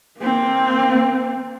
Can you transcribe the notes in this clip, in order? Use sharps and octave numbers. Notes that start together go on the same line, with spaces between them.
A#3 C4